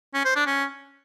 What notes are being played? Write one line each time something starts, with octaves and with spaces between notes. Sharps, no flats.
C#4
C5
D4
C#4